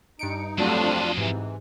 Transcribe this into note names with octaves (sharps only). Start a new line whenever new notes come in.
G2 D#4 C#7 D7
F2 F#3 G3 A3 C4 D4 F4 G#4
G#2 C3 E3